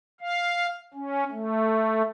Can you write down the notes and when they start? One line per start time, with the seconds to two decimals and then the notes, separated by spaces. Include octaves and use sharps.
0.21 F5
0.94 C#4
1.31 A3